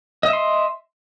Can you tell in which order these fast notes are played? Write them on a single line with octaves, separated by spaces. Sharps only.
D#5 E5 C6